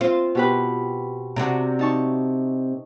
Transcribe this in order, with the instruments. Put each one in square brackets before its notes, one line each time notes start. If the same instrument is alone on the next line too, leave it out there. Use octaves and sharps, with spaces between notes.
[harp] C4 C5 [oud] F4
[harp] B2 G4 B4
[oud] C3 D4 F#4 [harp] A#5
[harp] D#4 A5 C#6